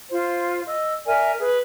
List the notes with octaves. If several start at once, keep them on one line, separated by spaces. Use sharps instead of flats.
F4 C5
D#5 E6
A#4 D5 E5 G#5
G#4 B4